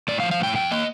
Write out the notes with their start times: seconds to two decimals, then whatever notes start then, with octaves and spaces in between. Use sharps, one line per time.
0.08 A2 D5
0.20 F5
0.23 F3
0.31 F5
0.40 A2 G5
0.55 F2 G5
0.71 A#3 D#5